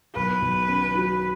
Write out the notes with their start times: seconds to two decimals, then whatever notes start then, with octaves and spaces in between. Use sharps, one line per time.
0.15 B1 B4
0.42 B1
0.69 C#4
0.95 F#3